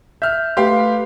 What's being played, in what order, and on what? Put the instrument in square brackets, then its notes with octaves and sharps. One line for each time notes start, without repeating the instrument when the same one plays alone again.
[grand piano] E5 F6 [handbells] G6
[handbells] A3 B4 C6 [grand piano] G4 F5
[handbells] B4